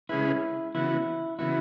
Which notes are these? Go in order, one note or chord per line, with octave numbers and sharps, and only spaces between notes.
C#3 G#3 C#4 E4 G#4 B4
C#3 E3 B3 E4 F#4
C#3 E3 B3 E4 F#4